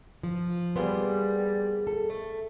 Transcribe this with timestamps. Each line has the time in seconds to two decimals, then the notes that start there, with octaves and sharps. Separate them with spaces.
0.23 F3
0.76 G3 A#3 B3 G#4 C5
1.87 A4
2.10 A3